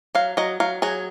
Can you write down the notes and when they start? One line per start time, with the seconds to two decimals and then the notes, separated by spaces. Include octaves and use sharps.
0.15 F#3 F5
0.37 F#3 D#5
0.60 F#3 F5
0.82 F#3 G#4